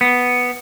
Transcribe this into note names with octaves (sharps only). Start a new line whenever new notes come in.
B3